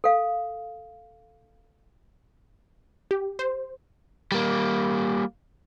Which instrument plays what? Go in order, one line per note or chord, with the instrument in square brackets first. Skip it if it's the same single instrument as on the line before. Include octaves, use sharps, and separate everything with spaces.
[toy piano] A4 F5
[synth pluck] G4
C5
[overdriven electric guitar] G3 A#3